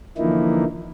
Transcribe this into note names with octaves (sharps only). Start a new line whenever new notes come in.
D3 E3 F3 A#3 D#4 E4